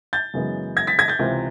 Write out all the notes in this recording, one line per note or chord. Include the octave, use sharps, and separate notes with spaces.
G6 A6
F#2 C#3 E3 G#3 B3
G#6 A#6
A6 B6
G#6 A#6
G6 A6
C#2 C3 E3